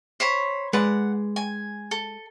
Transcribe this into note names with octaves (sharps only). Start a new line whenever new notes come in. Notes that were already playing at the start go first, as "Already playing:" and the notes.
C5 C#5 B5
G#3 B4 D5 F#5
G#5
A4